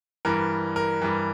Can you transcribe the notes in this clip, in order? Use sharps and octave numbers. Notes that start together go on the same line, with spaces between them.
G2 E3 A#4
A#4
G2 E3